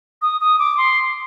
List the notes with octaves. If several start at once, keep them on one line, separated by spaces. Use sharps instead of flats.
D#6
D#6
D6
C6